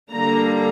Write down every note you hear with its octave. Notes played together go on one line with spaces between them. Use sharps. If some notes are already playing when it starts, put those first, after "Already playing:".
D3 G3 A#3 D4 A#5